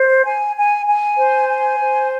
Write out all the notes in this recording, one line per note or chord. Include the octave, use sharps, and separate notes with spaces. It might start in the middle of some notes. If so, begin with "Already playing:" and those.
Already playing: C5
G#5
G#5
G#5
C5
G#5
C5